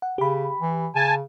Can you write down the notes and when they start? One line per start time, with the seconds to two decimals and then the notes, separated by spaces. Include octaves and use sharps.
0.02 F#5
0.18 C#3 G4 B5
0.60 E3
0.95 C#3 G#5 A5